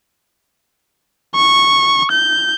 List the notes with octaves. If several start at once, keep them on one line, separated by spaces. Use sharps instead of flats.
C#6
G6